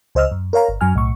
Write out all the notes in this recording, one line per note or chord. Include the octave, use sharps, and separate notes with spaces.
C#2 C5 D#5 E6 F6
F#2
A#4 C#5 F5 A#5
G1
F#2 F#3 G#5 F6
B1 A2 C#6